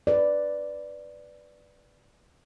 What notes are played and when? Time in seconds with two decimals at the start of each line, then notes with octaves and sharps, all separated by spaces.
0.07 B4 D5